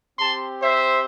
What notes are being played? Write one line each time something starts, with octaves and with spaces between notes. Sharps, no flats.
C4 G4 A5 C6
C5 E5